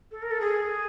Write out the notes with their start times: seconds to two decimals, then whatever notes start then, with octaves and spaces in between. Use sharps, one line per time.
0.11 A4
0.22 A#4
0.31 A4
0.41 G#4